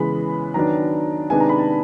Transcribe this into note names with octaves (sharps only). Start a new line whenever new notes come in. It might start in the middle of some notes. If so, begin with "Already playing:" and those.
Already playing: C#3 E3 G#3 B3 B5
D#3 F#3 B3 D4 A#5
C3 D#3 G#3 B3 D4 G#5
A#5
B5
A5